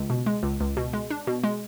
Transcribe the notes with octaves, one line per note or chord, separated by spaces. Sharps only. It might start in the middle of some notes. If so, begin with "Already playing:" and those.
Already playing: C#2
B2
G#3
C#2
C#2
B2
G#3
D4
B2
G#3